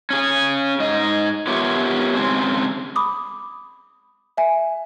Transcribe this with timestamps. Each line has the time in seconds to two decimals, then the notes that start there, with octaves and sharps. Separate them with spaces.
0.10 C#4 G#4
0.80 G#2 D#5
1.47 B3 F4 G4 A#4 C#5 E5
2.15 C#3 G#3 C4
2.96 B5 D6 D#6
4.37 E5 G#5